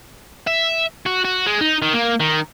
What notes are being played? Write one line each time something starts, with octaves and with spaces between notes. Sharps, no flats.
E5
F#4
F#4
G#3
D#4
D#3
A#3
D#3